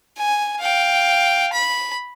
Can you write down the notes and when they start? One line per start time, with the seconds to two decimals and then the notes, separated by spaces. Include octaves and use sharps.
0.17 G#5
0.59 F5 G5
1.53 B5